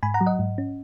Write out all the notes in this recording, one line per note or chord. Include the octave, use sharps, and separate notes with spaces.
G#2 G#5 B5
F#5 A#5
F#3
D#5 F#5
G#2
C#4